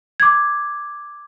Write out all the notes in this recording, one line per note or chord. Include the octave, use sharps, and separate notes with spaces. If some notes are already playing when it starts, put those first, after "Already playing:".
D6 G#6